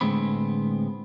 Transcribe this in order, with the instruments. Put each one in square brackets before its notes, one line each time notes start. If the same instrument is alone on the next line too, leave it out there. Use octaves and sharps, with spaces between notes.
[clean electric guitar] A2 D3 G#3 B3 C4 B5